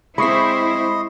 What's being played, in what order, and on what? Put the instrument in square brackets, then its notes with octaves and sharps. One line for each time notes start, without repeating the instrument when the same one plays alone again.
[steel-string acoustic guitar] G#3 C4 [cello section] E4 C5 [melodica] D#5 [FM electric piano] B5 C#6 C7